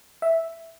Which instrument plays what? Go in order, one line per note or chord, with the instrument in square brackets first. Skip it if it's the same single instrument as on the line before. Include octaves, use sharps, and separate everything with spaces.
[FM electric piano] E5